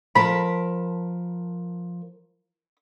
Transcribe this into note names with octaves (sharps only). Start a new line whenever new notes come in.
F3 A#4 A5 B5